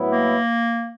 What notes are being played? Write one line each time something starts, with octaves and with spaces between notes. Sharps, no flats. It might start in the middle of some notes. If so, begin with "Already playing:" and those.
Already playing: A2 F#3 B3 E4
A#3